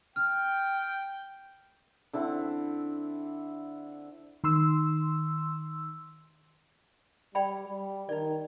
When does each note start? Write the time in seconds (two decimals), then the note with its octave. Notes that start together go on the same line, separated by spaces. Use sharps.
0.16 G5 F6
2.13 D3 C4 E4
4.44 D#3 C6 E6
7.35 G3 D5 G5 B5
7.68 G3
8.09 D#3 D#4 D5